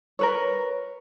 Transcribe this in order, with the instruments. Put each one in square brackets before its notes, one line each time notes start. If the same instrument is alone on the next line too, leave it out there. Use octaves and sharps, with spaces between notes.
[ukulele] A#4 B4 C#5